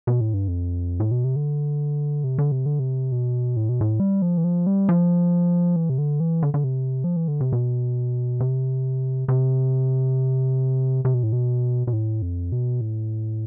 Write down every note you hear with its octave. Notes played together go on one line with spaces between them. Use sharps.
B2
A2
G2
F2
A2
B2
C3
D3
C3
D3
C3
D3
C3
B2
A2
B2
A2
G3
F3
E3
F3
G3
F3
E3
C3
D3
E3
D3
D3
C3
F3
E3
D3
C3
B2
C3
C3
C3
B2
A2
B2
B2
A2
F2
B2
A2